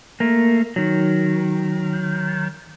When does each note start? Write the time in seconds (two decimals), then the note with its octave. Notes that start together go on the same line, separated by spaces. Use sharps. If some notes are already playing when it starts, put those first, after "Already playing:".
0.20 A3 A#3
0.76 D#3 F#3